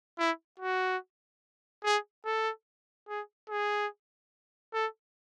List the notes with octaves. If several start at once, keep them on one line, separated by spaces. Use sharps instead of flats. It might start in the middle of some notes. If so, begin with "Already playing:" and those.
E4
F#4
G#4
A4
G#4
G#4
A4